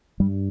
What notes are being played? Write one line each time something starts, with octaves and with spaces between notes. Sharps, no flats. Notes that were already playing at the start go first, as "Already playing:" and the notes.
G2 G3